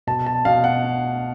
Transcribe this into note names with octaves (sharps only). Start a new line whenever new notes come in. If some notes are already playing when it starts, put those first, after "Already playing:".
B2 A5
A5
B2 F5
F#5